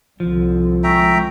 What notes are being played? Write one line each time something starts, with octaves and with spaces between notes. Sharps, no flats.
C2 D3 F3
G#3 E5 G5 A#5 C#6